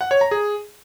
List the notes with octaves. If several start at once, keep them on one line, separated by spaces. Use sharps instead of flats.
F#5
C#5
A#5
G#4